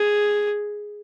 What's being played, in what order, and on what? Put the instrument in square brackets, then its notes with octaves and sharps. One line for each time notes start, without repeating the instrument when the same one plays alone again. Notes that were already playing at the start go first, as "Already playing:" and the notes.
Already playing: [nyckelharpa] G#4